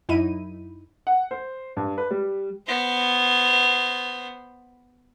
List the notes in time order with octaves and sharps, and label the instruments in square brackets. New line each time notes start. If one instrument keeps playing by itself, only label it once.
[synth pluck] F#2 D#4 E4 B5 D#7
[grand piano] F#5
C5
G2
B4
G3
[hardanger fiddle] B3 C5